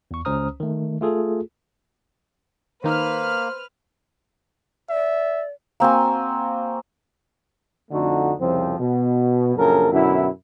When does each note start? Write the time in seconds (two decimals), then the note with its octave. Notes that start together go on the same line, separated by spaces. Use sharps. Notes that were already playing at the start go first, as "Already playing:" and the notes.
0.11 E2 C#6
0.25 C#2 C#4 C5 A#5 D#6 F6
0.60 D#3 A3
1.01 A3 F4 G#4 A4
2.84 D#3 A#3 D#4 B4 C5 F6
4.90 D5 E5
5.80 A#3 C4 F#4 G#5
7.91 F2 D3 A3 D#4 F#4
8.39 C2 F2 C#3 F3 C4
8.79 B2
9.56 A#1 F#2 C#3 A4 A#4
9.92 F#2 B2 D3 E4